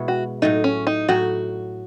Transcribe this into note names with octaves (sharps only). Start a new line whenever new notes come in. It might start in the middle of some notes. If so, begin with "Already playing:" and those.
Already playing: B2 G#3 B3 E4
F#4
A2 F#3 A3 D#4
C#4
D#4
A2 F#3 A3 D#4 F#4